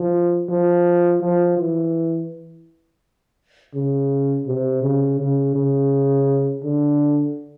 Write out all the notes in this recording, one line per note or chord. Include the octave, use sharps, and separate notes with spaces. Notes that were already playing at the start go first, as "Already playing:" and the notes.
Already playing: F3
F3
F3
E3
C#3
C3
C#3
C#3
C#3
D3